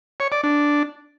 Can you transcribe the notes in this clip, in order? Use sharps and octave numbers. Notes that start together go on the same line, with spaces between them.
C#5
D5
D4